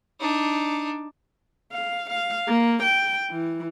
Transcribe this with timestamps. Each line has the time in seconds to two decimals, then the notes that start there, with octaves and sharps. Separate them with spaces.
0.20 D4 D#4
1.72 F5
2.10 F5
2.48 A#3
2.83 G5
3.31 E3